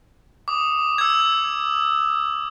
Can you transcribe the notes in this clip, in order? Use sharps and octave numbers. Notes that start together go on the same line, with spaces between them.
D6 D#6
E6 G#6